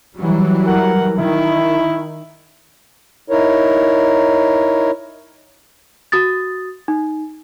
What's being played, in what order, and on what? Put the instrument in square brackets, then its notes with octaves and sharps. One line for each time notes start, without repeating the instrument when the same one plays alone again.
[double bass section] E3 F#3 G3
[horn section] A#4 F#5
[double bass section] D#3 [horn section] E4
[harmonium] D#4 E4 A#4 C#5
[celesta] F#4 D#6 A6
D#4